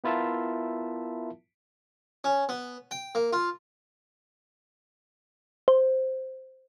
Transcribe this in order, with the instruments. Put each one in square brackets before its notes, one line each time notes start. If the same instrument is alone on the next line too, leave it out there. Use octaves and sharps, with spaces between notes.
[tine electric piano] B3 E4 F4 A#4 E5 A5
[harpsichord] C#4
B3
G5
A#3
F4
[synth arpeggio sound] C5